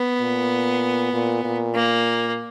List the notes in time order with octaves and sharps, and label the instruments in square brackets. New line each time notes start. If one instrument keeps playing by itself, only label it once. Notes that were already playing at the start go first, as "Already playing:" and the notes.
Already playing: [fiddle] B3
[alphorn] A#2
A#2
A#2
[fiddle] A#3